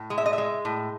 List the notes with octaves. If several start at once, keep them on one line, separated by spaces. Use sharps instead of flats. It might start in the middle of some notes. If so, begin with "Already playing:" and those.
Already playing: A2
G#3
E5
D#5
E5
G#3
A2